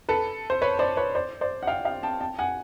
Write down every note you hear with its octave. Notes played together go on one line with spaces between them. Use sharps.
A4 B4
C5
B4 C#5
C5 D5
B4 C#5
C5 D5
C5 D5
F#5
F5 G5
F5 G5
G5 A5
G5 A5
F#5 G#5